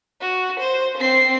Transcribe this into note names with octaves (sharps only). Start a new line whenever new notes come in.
F#4
C5
C4 C7